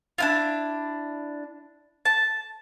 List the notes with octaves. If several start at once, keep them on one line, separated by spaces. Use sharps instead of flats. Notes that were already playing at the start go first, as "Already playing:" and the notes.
D4 E4 F4
A5